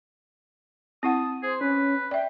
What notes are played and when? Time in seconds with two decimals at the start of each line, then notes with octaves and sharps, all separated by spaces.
1.03 C4 E4 F#5 A5 D#6
1.43 G#4 C5
1.61 C#4 B4
2.11 D5 E5 G5